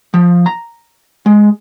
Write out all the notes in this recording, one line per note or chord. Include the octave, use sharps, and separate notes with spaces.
F3
A#5
G#3